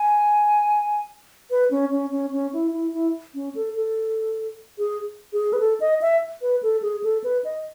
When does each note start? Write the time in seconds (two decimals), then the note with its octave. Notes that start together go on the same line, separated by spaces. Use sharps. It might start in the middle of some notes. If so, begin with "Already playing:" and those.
Already playing: G#5
1.51 B4
1.71 C#4
1.92 C#4
2.12 C#4
2.33 C#4
2.53 E4
2.73 E4
2.94 E4
3.35 C#4
3.55 A4
3.75 A4
4.78 G#4
5.33 G#4
5.53 B4
5.60 A4
5.80 D#5
6.01 E5
6.42 B4
6.63 A4
6.82 G#4
7.04 A4
7.24 B4
7.45 D#5